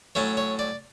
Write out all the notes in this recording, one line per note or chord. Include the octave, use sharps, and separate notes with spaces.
A2 F#3 A3 C#4 C#5
C#5
D5